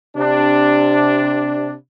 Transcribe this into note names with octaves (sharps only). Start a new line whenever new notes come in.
C3 D4